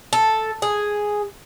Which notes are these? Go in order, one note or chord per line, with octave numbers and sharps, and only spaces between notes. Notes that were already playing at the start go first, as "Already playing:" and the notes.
A4
G#4